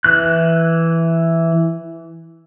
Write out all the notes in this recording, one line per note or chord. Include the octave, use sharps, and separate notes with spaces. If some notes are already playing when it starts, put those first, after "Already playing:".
E3 F#6